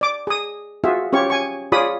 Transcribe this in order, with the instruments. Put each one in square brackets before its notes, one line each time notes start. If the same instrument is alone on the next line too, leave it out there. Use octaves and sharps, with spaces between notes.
[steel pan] D5 D6
G#4 D#6
F4 F#4 G#4 E5
C#4 F4 G4 C#5 C#6
G#5 C#6
F4 G#4 C#5 D5 B5 D#6